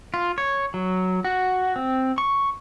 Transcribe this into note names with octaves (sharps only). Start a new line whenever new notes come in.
F4
C#5
F#3
F#4
C4
C#6